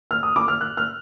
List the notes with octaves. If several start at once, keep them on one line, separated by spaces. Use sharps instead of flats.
F6
D#6
D6
F6
F#6
F6